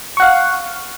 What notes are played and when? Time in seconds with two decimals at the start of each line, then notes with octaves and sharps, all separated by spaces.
0.17 C#6
0.20 F#5
0.22 F5